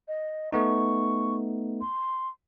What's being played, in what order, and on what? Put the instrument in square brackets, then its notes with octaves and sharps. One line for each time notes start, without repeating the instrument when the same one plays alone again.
[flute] D#5
[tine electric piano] A3 B3 D#4 [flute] C#6
[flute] C6